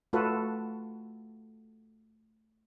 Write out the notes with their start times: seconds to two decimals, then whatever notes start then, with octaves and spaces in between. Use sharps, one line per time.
0.13 A3 F4 F#4 A4 B4